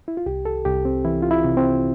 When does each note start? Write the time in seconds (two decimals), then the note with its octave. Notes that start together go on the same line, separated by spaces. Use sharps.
0.08 E4
0.17 F4
0.26 C2 G4
0.45 A4
0.65 C2 G4
0.85 C4
1.05 E3 E4
1.22 F4
1.31 E4
1.44 C3
1.57 C4